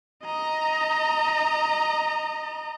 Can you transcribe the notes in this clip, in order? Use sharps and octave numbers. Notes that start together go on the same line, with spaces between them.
D#5 A#5